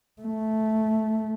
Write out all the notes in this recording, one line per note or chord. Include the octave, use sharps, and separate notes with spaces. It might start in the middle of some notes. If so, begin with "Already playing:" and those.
A3